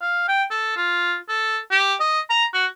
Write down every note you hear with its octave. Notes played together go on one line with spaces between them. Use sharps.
F5
G5
A4
F4
A4
G4
D#5
A#5
F#4